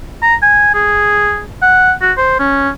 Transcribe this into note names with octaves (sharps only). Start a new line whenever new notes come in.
A#5
G#5
G#4
F#5
F#4
C5
C#4